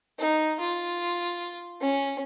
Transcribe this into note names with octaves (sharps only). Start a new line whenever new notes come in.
D#4
F4
C#4